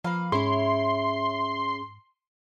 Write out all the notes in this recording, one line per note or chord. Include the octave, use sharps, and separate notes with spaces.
F3 A#3 B4 F5
G#2 C#4 E4 G#4 C#5 C6